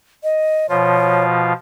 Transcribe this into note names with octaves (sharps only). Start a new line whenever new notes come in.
D#5
B2 F3 F4 C#5